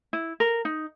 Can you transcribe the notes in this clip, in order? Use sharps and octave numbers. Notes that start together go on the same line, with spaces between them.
E4
A#4
D#4